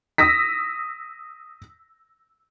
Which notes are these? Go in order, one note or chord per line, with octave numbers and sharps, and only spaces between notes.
D#6 E6 A#6 B6